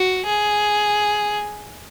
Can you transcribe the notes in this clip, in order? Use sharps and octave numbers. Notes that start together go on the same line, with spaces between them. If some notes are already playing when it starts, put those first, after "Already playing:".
Already playing: F#4
G#4